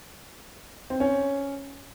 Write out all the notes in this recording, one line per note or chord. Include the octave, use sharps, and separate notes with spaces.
C4
C#4